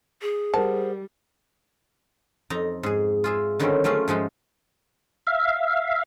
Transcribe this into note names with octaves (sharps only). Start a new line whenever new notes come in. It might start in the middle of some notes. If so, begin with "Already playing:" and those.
G#4
G3 A#4 C5 F#5 A5
F2 D#4 A#5
G#2 G#4
F4 G#4 E5
D3 D#3 F#3 G3 C4 C#4
F#3 A3 C#4 F4 G#4
G#2 F3 G#3 D#4
E5 F5